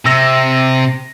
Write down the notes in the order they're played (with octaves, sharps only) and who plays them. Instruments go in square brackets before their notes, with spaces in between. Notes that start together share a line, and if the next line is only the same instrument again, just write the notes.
[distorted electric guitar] C3 [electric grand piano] E6 A#6